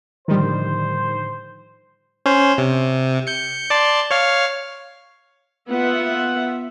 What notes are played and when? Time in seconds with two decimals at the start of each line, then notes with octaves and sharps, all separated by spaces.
0.28 A2 D3 D#3 F3 G3 C5
2.26 C#4 C5
2.58 C3
3.27 G6 C#7
3.70 D5 A5 C6
4.11 C#5 F5 F6
5.69 B3 F4 E5 F#5